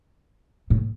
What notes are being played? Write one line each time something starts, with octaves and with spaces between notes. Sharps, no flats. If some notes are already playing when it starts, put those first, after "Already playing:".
A2